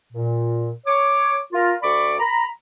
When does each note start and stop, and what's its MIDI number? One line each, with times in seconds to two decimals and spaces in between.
0.13 0.71 46
0.87 1.39 73
0.87 1.39 86
1.53 1.73 65
1.53 1.73 70
1.82 2.14 38
1.82 2.14 74
1.82 2.14 83
1.82 2.14 85
1.82 2.14 86
2.19 2.46 82
2.19 2.46 83